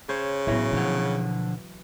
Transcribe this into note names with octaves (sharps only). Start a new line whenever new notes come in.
C#3 C5 C#5
A2 E3 F#3 B3
B2 D3 F3 F#5